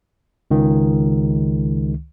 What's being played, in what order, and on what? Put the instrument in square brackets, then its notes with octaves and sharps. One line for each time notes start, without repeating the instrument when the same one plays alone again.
[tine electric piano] C#2 D#3